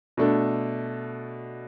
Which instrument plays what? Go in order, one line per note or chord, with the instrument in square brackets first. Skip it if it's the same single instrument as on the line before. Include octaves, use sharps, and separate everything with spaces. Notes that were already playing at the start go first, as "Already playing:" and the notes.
[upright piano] B2 A3 D4 A4